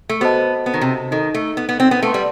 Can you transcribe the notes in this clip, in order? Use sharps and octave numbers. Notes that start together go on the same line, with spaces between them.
A3
B3 F#4 A4 C5 D#5 A5
B3
D#3
C3
D#3 D#4 A4 D#5
A3
B3
B3
C4
B3
A3 B4 F#5 A5 C6
G3